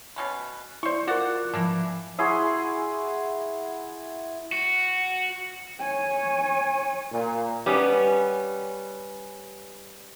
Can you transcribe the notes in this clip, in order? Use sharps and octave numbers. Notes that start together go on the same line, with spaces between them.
B2 C#4 B4
E4 C5 D5 C#6
F4 F#4 A#4 D5 F#5
G#2 E3 F3 A#3 D4
E4 F#4 G#4 C6
F#4
C#5 G#5
A#2
G3 B3 C#4